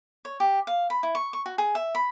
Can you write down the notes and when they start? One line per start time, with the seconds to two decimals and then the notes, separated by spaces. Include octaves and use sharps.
0.25 C#5
0.40 G4
0.67 F5
0.90 B5
1.03 E4
1.15 C#6
1.33 C#6
1.46 F#4
1.58 G#4
1.75 E5
1.95 B5